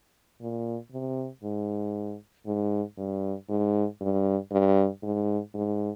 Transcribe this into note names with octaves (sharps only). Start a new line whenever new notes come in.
A#2
C3
G#2
G#2
G2
G#2
G2
G2
G#2
G#2